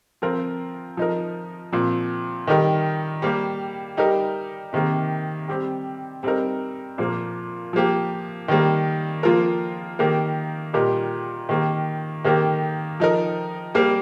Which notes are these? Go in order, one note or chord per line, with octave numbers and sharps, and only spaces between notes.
F3 C4 F4 A#4
F3 D#4 A#4
A#2 F3 C4
D#3 G3 D#4 G4 A#4
G3 A#3 G4
G3 D#4 G4 A#4
C3 D#3 A#3
G3 C4 G4
G3 C4 D#4 A#4
A#2 F3 A#3
F3 A#3 G4
D#3 G3 A#3
F3 A#3 F4 A#4
D#3 A#3 G4 A#4
A#2 G3 D#4 G4 A#4
D#3 A#3 G4
D#3 A#3 G4 A#4
F3 D#4 A#4
G3 A#3 G4 A#4